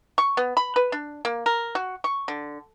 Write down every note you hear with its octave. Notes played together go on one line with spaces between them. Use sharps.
C#6
B3
B5
B4
D4
A#3
A#4
F#4
C#6
D3